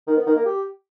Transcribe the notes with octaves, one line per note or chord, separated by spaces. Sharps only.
D#3
B3
D#3
A#3
G4